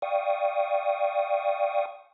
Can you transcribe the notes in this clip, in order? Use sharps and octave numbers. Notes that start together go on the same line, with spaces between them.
D5 F5 G5 C#6 D#6